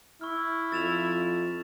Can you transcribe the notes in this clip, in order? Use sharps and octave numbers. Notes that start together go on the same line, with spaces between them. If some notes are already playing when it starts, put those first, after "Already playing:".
E4 C#6 F6
F2 A6 E7 F7